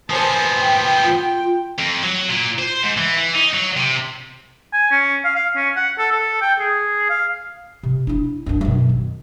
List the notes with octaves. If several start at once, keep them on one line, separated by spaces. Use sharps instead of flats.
F3 B3 C5 G#5 A5
G5
F4
F2
F#3
A#2
C5
G#2
E3
E3
D#4
F#3
C3
G#5
C#4
F5
F5
C#4
F#5
A4
A4
G5
G#4
F5
C3
D4 E4
F#2 D4
F#2 B2
D#2